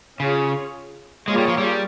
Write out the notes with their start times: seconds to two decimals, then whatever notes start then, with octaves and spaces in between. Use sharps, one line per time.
0.19 C#3 C#4 F4 G#4 C#5
1.28 G#3 A#3 F4 G#4 C#5
1.38 G3
1.48 F3
1.58 G3